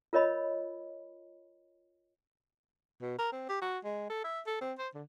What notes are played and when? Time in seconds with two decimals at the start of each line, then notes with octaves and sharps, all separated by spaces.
0.13 F4 A#4 C#5 D#5 B5
3.02 B2
3.18 A#4
3.32 C4
3.49 G4
3.61 F#4
3.84 G#3
4.10 A4
4.24 E5
4.47 A4
4.61 C4
4.79 C5
4.95 D3